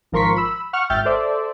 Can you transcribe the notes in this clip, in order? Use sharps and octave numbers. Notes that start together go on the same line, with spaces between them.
G#1 F3 A#4 C6 C#6 B6
B5 E6
F#5 C#6 F6
G#1 E5 G5 F6 G6 A6
A4 C5 D5 E5